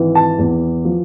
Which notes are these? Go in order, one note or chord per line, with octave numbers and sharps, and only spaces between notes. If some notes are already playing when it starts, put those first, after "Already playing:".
Already playing: G#1 E3
A5
E2
F3